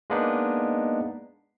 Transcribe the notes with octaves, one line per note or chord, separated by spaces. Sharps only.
G#3 A#3 B3 D4 D#4